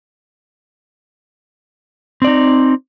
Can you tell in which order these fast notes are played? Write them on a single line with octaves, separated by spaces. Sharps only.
C4 D5 D#4